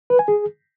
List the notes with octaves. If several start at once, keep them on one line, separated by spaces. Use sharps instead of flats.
B4
G#5
G#4